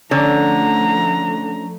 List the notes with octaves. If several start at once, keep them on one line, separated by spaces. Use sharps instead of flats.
D3 F3 A3 C#4 D4 A#5